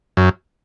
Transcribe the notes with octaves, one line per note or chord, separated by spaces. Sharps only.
F#2